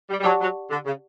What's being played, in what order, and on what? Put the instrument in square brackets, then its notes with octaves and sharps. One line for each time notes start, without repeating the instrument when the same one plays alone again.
[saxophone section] G3
G3
[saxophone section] F#3 [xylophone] G4 D5 F#5 A5 C#6
[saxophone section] F#3
D3
C#3